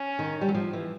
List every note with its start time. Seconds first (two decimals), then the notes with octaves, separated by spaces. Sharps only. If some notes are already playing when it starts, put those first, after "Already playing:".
Already playing: C#4
0.19 D#3
0.41 G3
0.49 F#3
0.55 F3
0.73 E3